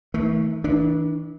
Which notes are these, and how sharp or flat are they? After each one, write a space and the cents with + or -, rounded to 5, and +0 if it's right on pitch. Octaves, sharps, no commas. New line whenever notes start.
E3 -45 A3 +10
E3 -40 D4 +0